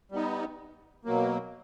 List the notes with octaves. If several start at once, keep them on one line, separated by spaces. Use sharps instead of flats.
G3 B3 D#4
B2 F#3 A#3